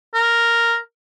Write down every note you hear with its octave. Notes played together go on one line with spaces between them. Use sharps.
A#4